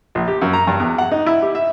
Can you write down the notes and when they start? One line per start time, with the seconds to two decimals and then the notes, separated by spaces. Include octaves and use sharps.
0.15 A#1
0.27 G4
0.41 F#2
0.53 A#5
0.67 G2
0.80 E2
0.98 F#5
1.12 D#4
1.26 E4
1.42 G4
1.55 E5